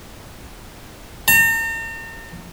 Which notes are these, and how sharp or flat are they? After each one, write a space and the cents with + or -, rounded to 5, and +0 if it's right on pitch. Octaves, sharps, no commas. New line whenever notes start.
A#5 -45